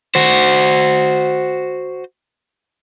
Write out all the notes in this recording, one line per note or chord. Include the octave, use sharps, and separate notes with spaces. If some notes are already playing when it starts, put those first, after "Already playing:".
F#4 C5